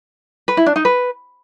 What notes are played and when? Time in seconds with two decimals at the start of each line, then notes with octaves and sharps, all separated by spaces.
0.48 B4
0.57 E4
0.66 D4
0.76 D#4
0.85 B4